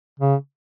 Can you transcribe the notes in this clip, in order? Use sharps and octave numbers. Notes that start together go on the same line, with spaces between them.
C#3